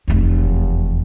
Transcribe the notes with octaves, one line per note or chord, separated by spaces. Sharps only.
F1 E2